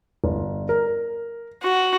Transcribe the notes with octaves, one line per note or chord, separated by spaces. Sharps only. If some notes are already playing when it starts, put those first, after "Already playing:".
G1
A#4
F#4